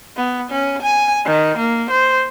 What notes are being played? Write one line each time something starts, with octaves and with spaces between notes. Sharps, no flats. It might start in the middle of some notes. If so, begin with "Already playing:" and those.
B3
C#4
G#5
D#3
A#3
C5